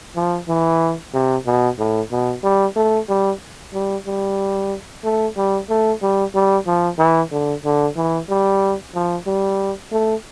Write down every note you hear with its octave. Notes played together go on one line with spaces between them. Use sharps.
F3
E3
C3
B2
A2
B2
G3
A3
G3
G3
G3
A3
G3
A3
G3
G3
F3
E3
D3
D3
E3
G3
F3
G3
A3